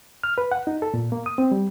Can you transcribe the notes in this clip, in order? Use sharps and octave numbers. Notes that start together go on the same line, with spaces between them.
F6
B4
F#5
D#4
A4
A#2
A#3
D#6
C4
G3